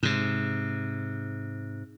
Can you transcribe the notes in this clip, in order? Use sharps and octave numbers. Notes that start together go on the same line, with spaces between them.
G#2 C3